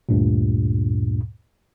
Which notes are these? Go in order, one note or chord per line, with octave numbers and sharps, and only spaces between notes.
D2 G2 A#2